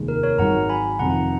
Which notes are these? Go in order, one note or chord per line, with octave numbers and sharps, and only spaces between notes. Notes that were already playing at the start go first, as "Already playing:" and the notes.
Already playing: F1 D#2 D#3 G#3
A#4
A#4 C#5
G#1 G#2 F#3 F#5 A#5
G#5 B5
F1 F2 D#3 F#5 A#5